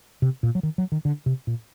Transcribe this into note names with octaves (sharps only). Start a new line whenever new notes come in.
C3
A#2
F#3
D#3
F#3
D#3
D3
C3
A#2